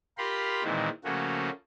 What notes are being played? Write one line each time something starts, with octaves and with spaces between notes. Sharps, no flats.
F4 G4 A#4 B5 C6
A#2 D#3 E3 G#3 C4
C#3 F3 A3 A#3 C#4 F#4